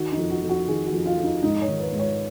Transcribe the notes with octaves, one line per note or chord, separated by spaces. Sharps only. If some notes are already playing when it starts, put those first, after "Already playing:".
Already playing: D#3 F#4
D#4
F2
F#4
F2
F#4
D#3 G#4
F#4
F2
F4
F2
D#4
G#2 D#4
C#5
D#3
B4
G#2
C#5